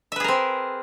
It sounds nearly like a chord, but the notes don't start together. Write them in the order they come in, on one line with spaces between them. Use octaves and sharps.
E5 B4 G#4 A#4 C4